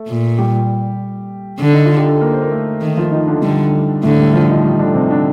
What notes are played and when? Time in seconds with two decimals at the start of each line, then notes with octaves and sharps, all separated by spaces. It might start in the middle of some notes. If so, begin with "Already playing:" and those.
Already playing: A3
0.08 A#2
0.38 G3 G4
1.60 D3
1.73 D#4
1.85 F4
1.97 G4
2.09 A4
2.21 A#3 A#4
2.33 C5
2.42 A#4
2.51 A3 A4
2.82 D#3 A3 A4
2.97 F3 F4
3.12 D#3 D#4
3.27 D3 D4
3.42 D3 G3
4.03 A2 D3 A3
4.19 G3
4.33 F3 F4
4.49 D#3 D#4
4.65 G3
4.79 D3 D4
4.94 C3 C4
5.10 D3 D4